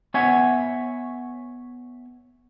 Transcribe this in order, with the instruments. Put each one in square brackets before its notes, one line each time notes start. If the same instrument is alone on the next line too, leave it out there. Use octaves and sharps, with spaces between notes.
[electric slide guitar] B3 C#5 E5 G#5